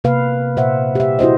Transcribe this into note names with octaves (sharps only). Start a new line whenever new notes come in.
C3 A#3 B4 F5
A#2 C5 E5 F#5
G4 E5
E4 F#4 C5 D#5